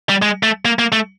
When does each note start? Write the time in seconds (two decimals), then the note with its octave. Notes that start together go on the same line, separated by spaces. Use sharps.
0.09 G3
0.22 G#3
0.43 A3
0.65 A#3
0.79 A#3
0.92 A3